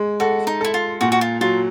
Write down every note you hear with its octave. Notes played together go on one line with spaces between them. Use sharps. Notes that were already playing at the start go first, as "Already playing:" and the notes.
Already playing: G#3
F#4 A4
D#4
E4 A4
F4
A#2 F#4
F#4
F4
F#3 F4